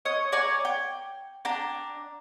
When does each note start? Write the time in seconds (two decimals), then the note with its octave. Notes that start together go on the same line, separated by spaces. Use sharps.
0.05 C#5 D#5 D#6
0.32 C#5 D5 G#5 A#5
0.65 G5
1.45 D4 G5 A#5